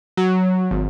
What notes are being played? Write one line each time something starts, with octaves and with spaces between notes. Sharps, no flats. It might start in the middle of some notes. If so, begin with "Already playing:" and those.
F#3
G#1